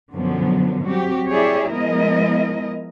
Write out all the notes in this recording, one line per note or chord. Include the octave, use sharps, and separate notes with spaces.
F#2 B2 D3 F3 F#3 B3
F#3 G3 C4 F#4 G4
E4 G4 G#4 C#5 D5 E5
F3 G#3 B3 E4 A#4 D#5